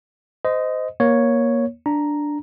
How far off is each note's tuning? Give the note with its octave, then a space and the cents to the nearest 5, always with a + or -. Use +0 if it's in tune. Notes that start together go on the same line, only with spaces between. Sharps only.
C5 -25 D#5 +5
A#3 +20 C#5 +0
D4 +0 A#5 +0